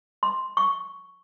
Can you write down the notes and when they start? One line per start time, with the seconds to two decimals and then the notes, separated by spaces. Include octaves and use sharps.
0.23 C6
0.57 C#6